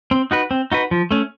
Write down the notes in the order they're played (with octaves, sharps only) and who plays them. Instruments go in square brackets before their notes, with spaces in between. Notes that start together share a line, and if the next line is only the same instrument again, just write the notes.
[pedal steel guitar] C4
D#4 F#4 B4
C4
D#4 F#4 B4
F3
A3 C#4